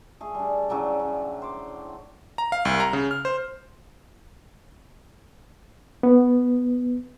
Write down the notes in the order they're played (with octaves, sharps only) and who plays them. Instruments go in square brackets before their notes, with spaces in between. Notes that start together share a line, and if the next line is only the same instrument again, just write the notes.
[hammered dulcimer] A3 G#4
G3 D4
A2 C#3 F#3 D5
D3
C5 D6
[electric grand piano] A#5
F5
C2
A#5
C#3
F6
C5
[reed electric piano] B3